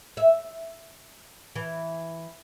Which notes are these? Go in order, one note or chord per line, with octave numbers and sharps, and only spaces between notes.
E5
E3